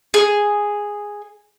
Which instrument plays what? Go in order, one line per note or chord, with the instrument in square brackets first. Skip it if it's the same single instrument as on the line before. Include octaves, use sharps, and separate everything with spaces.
[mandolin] G#4